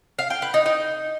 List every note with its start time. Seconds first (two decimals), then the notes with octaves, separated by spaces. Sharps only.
0.19 F5
0.30 G5
0.42 B4
0.54 D#4
0.66 D#4